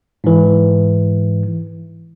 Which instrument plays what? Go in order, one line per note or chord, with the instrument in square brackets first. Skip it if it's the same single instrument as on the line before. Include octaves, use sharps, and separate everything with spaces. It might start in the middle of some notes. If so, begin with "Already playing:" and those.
[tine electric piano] G#2 E3